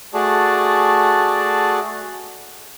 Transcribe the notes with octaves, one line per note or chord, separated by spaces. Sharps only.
A3 F#4 G#4 D5 A5